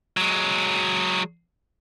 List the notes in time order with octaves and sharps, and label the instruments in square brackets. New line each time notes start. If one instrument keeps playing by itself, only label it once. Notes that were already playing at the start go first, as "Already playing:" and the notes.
[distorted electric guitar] F#3 G#3